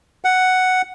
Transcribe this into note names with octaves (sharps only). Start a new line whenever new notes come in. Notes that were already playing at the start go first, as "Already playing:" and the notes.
F#5